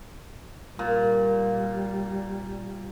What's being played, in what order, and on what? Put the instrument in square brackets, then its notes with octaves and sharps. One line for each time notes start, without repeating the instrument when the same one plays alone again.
[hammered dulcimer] A#2 [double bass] G3